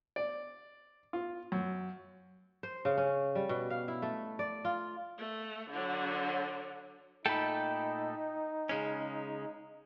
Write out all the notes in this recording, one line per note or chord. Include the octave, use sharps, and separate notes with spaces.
D5
F4
F#2
C5
C#3
C#4
G3
B2
F5
E4
A3
D5
F4
A3
D3 F#3
A#2 A3 D#4 A4 G5 B5
C#3 G#3 C#4